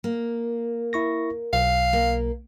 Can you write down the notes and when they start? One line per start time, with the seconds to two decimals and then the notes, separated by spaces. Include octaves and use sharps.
0.04 A#3
0.93 E4 C#6 A#6
1.53 B1 F5
1.93 A#3